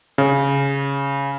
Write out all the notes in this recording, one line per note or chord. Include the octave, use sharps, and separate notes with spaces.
C#3